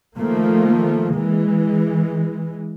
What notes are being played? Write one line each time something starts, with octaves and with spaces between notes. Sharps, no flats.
D#3 F3 A3 A#3
E3 G#3